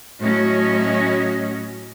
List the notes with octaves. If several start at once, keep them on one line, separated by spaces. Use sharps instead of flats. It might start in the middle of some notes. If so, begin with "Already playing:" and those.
A2 F#3 C#4 F#4 D#5